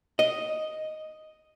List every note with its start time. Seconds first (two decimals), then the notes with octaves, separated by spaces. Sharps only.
0.19 D#5